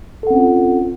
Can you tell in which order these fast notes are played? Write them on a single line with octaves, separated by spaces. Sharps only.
A4 F#5 C4 C#4 F4